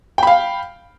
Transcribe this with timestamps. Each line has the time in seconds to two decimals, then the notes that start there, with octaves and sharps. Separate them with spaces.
0.18 G5
0.23 B5
0.27 F5